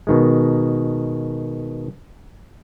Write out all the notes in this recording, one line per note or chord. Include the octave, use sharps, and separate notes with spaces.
B2 D#3 G#3